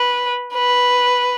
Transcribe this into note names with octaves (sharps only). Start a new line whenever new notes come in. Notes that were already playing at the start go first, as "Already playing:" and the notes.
Already playing: B4
B4